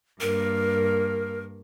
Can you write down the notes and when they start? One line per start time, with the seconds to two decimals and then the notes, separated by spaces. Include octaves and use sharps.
0.21 G2 A#3 A#4